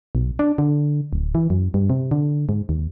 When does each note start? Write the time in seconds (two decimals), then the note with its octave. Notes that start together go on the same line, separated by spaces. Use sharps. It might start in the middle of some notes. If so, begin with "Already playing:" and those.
0.15 B1
0.39 D4
0.58 D3
1.13 D1
1.35 E3
1.50 F#2
1.74 G2
1.90 C3
2.11 D3
2.49 G#2
2.69 D#2